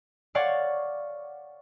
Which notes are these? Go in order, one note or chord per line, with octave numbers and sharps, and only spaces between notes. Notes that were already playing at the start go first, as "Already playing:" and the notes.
C#5 D5 F5 F#5 C#6 A6